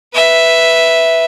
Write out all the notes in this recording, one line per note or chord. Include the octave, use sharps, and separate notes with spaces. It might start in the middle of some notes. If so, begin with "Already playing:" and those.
B4 E5